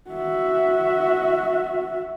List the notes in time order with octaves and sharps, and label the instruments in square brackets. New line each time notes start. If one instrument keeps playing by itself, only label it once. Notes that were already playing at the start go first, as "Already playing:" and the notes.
[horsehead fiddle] F#4 E5